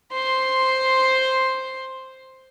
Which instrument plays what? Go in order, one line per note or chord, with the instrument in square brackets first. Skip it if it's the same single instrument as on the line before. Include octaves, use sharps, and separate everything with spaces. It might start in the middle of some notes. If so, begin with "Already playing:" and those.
[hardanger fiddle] C5 C6